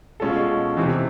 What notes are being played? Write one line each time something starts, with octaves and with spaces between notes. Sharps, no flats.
B2 G#3 C#4 F4 A4
E2 C3 E3